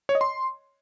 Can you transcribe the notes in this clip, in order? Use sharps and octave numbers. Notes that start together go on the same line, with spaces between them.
C#5
D#5
C6